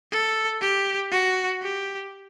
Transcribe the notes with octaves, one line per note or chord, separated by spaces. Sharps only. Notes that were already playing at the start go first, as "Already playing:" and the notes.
A4
G4
F#4
G4